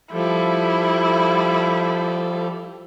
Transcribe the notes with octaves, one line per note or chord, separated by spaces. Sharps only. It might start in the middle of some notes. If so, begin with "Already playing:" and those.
F3 G3 E4 A4